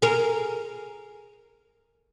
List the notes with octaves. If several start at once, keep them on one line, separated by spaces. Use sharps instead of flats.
G#4 A#4